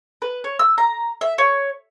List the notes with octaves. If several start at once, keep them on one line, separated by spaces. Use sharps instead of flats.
B4
C#5
E6
A#5
E5
C#5